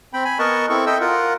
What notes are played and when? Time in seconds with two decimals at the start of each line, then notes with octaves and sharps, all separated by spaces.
0.13 C4 G5 B5
0.25 G#5 B5
0.39 B3 A#4 D#5 F#5 A5 C#6
0.69 C4 E4 A4 C#6
0.86 A4 D#5 E5 G5 E6
1.00 F4 A#4 F#5